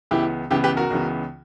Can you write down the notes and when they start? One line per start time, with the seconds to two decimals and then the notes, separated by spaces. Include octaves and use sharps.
0.11 C#2 C#3 E3 B3 E4 G4
0.50 C#2 C#3 E3 B3 E4 G4
0.64 G4 B4
0.77 F#4 A#4
0.90 C#2 C#3 E3 B3